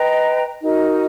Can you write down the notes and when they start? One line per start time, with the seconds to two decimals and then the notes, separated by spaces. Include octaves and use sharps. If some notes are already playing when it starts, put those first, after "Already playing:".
Already playing: B4 D#5 G5 A#5
0.62 D#4 F#4 A#4 D#5